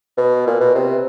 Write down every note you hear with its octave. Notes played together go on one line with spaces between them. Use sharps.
B2
A#2
B2
C3